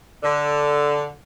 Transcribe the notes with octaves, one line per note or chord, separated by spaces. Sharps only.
D3